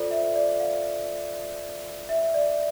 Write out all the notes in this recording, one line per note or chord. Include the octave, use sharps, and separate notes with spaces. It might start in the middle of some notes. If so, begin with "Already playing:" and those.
Already playing: F4 A4 C5 D5
E5
D5
F5
E5
D5